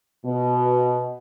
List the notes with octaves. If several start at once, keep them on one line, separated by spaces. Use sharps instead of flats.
B2